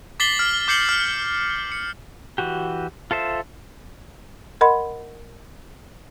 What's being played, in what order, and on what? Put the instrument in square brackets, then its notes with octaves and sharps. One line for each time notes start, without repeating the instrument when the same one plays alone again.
[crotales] D6 A6 B6 C7 F#7 G7
F6
D6 G6 C7 C#7 F#7
F6
C#7
[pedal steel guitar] E3 F#4 G4
F4 A4 C5 E5
[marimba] A#4 D#5 F#5 B5 C6